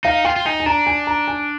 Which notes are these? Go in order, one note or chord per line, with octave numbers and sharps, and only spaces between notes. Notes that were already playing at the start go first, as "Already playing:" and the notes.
D#4 F5
F4 G5
F4
D#4 G#5
G#5
D4 A#5
G#5
A#5
G#5